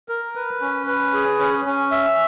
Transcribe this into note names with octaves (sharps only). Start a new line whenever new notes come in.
A#4
B4
C#4
B4
G#4
C#4
C#4
E5